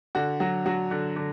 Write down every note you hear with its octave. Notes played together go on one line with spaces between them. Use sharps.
D3 F#4
F#3 F#4
F#3 F#4
D3
D3